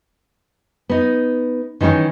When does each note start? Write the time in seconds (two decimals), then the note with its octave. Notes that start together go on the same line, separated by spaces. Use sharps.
0.89 B3 D#4
1.81 D#3 E3 G3 C#4 D#4